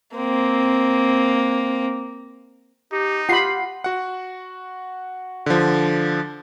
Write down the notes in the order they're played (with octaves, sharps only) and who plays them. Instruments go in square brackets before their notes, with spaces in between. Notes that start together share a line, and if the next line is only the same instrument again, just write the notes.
[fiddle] A#3 C4
[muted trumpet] D#4 [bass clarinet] G4
[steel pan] F4 B5 [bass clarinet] G4 [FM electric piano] F#5 C7
[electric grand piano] F#4 F#5
D3 F3